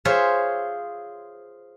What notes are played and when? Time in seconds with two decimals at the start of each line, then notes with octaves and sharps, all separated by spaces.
0.05 F4 G#4 C5 C#5 E5